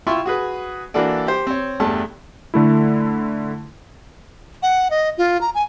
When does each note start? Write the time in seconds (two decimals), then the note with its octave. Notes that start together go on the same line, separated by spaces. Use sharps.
0.07 E4 F4 E5 G5 C6 C#6
0.26 F#4 G#4 B4
0.94 E3 A#3 D4 F#4 A4 D5
1.27 G4 C5
1.47 C4 C#5
1.80 E2 G2 A3 A5
2.54 D3 A3 E4
4.63 F#5
4.91 D#5
5.18 F4
5.41 A#5
5.55 G#5